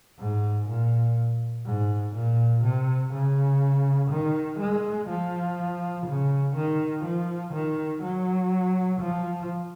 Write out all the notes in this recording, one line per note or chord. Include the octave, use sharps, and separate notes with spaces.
G#2
A#2
G#2
A#2
C3
C#3
D#3
G#3
F3
C#3
D#3
F3
D#3
F#3
F3